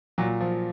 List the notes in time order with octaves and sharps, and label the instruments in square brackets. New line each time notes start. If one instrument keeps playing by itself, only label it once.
[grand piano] A#2 F#3
F3